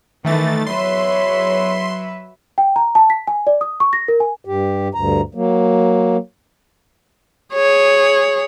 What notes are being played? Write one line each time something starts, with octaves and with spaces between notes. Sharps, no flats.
D#3 E3 A3 A6
E2 F#3 B4 C#5 E5 C6
G5
A#5
A5
B6
G#5
D5
D#6
C#6
A#6
A#4
G#5
G2 G4
D2 G2 A#5
F#3 A#3
G#4 C#5